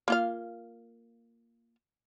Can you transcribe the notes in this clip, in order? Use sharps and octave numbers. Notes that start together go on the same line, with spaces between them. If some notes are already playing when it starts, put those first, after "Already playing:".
A#3 F4 F5